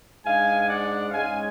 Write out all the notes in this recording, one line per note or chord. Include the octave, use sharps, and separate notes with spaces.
G#2 G#3 D4 F5 G#5
D5 F#5
G#2 G#3 C#4 F5 G#5